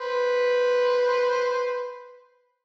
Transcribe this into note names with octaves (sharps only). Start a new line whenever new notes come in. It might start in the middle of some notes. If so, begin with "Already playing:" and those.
B4 C5